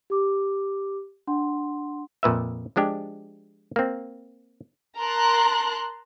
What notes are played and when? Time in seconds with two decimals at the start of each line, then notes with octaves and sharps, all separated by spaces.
0.10 G4 D6
1.27 D4 F#5 C6
2.23 F2 A#2 B4 E5
2.76 F3 G#3 D4 G4
3.76 A#3 C4
4.98 A#4 A5 A#5 C6 F#6